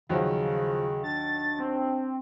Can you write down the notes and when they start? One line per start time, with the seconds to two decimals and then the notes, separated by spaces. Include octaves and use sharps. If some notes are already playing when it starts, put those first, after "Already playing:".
0.09 D#2 C#3 F3 F#3
1.03 D4 A6
1.59 C4